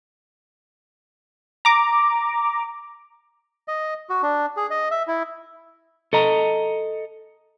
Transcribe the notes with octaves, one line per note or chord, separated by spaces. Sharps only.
A#5 D6
D#5
F#4
D4
G#4
D#5
E5
E4
A4 D#5 A#5